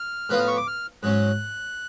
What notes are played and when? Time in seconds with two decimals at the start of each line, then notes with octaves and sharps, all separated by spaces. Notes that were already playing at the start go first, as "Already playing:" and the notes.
Already playing: F6
0.29 A2 F3 B3 F4 B4 F#6
0.39 F6
0.48 C#6
0.57 D6
0.67 F6
1.03 G#2 F#3 C#4 F#6